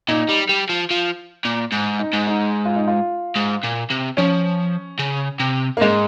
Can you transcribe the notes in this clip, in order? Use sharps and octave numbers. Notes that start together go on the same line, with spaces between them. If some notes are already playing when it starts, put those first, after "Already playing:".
A#2 D#4
G3
G3
F3
F3
A#2
G#2
D#4
G#2
D#4
F4
D#4
F4
G#2
A#2
C3
F3 C#4
C#3
C3
A#3
G#2 G#3